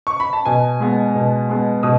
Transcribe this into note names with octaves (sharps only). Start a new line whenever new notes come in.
C#6
B5
A5
B2 G#5
G#3 B3
B2
G#3 B3
B2 D#6